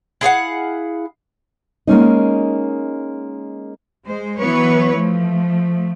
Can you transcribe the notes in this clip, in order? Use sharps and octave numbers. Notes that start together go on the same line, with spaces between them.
E4 G#4 F5 F#5
G#3 A#3 C#4 D#4
G#3 C5
E3 F#3 B3 B4 C#5
F3 A3